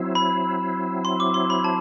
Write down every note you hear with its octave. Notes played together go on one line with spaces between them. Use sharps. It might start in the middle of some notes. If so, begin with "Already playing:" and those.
Already playing: F#3 C4 E4
B5
C6
D6
C6
B5
A5